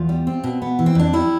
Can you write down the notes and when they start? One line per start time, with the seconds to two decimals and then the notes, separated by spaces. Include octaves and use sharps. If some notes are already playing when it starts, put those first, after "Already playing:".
Already playing: E2 F4
0.09 G3
0.27 C4
0.44 B2
0.62 B3
0.79 E3
0.86 C4
0.95 F2 D4
1.13 G3 E4